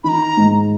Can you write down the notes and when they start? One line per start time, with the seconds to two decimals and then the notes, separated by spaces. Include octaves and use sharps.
0.04 D#3 A#5 B5
0.37 G#2